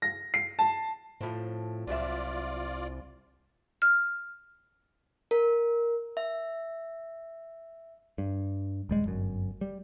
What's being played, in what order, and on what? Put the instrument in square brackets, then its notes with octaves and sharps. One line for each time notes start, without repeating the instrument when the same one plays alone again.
[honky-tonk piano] A#6
C7
A5
[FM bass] A2 [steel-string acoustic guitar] F3 C4
[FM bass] C2 [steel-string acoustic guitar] F#3 E5 [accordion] F4 D5
[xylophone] F6
[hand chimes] A#4
E5
[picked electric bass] G2
D#1 G3 G#3
G1 F#2
G3